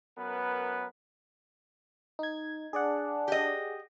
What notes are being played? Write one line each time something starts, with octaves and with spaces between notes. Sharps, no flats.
F#2 B3 A#4 B4
D#4 G#6
D4 G#4 D5 F#5
G4 D#5